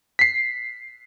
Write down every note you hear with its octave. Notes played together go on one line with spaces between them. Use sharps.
B6 C7